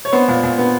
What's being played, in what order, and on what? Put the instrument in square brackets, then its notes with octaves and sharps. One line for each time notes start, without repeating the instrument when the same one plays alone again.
[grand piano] C#5
B3 C5
A#2
A#2
B3